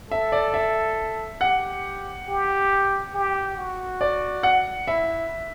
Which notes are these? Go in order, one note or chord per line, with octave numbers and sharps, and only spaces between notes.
A4 E5
D5
E5
G4 F#5
G4
G4
F#4
D5
F#5
E4 E5